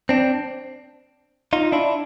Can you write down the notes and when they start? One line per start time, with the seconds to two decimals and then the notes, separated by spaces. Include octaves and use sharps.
0.09 C4 D4
1.53 D#4 F4
1.72 D4 E4